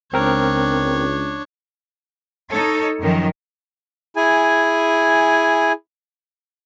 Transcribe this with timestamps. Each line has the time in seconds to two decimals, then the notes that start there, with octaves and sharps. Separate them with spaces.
0.14 C#2 C4 D4 A#4 C#5
2.51 D#4 A4 C#5
3.00 F#2 D#3 F3
4.16 E4 G#4 G#5